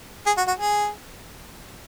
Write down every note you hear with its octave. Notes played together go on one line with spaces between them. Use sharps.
G#4
F#4
F#4
G#4